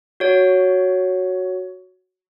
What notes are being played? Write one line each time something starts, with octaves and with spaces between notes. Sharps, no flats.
F#4 C#5